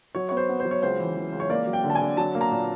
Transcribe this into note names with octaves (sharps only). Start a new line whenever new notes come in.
F#3 C#5
B3 C#5
C5
B3
C5
F#3
C#5
C#2 C5
E3
E3
C#2
C#5
A#3 D5
F#3
G5
D3
A5
G#5
D3
F#3 A5
A#3
A#5
A#2